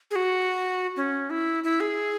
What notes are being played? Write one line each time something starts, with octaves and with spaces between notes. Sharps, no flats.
G#4
F#4
C#4
E4
E4
G#4